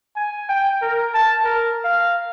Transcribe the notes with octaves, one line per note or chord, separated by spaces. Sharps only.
G#5
G5
A#4
A5
A#4
F5